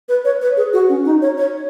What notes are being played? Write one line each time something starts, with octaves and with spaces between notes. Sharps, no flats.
B4
C#5
B4
G#4
F#4
C#4
D#4
C#5
C#5